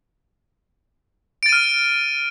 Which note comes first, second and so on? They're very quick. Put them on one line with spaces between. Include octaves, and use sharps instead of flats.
D7 A6 D#7 F6